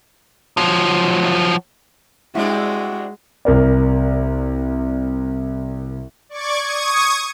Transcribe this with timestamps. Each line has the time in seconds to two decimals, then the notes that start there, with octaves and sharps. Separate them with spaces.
0.57 F3 F#3
2.35 G3 G#3 C4 D4 E4 F#4
3.45 C2 A#4 D5
6.29 D5 C#6 D6 G#6
6.63 C#6 D#6 G#6